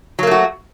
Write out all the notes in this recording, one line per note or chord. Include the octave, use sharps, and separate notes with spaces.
F#3 A3 A#3 F#4